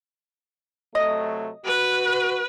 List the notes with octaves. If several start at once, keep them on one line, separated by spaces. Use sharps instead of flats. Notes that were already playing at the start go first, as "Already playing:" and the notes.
C3 F#3 A3 D#5
F#4 B4